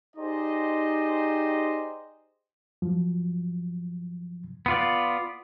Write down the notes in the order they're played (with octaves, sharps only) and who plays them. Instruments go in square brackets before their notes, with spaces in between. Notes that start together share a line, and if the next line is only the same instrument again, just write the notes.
[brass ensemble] D#4 G4 G#4 C5 D5 D#5
[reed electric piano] G2 F3 F#3
[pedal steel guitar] B3 F4 D5